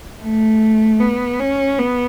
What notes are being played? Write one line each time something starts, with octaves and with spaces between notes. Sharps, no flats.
A3
B3
C#4
B3